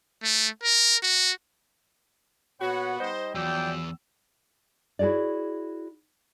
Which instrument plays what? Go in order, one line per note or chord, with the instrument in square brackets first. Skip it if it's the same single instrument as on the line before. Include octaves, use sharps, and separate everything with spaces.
[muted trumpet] A3
A#4
F#4
[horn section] A#2 F#4 [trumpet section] B3 F#5 B5 [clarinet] C#5
[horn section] G3 D#4 C5 [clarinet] D#5
[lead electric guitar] E2 [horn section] F3 F#3 [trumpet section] D5 G5 [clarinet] E6
[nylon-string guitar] E4 F#4 G#4 C#5 D5